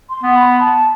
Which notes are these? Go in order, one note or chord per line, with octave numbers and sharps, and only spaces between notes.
C6
B3
B5
A5